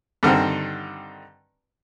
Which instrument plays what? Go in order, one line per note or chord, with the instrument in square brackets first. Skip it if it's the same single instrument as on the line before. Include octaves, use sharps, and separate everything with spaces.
[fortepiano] G2 D3 D#3 C4